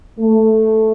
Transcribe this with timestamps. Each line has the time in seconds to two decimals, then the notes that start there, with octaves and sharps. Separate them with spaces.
0.19 A3